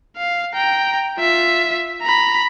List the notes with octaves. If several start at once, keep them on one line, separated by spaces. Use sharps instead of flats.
F5
G5 A#5
F4 E5
A#5 B5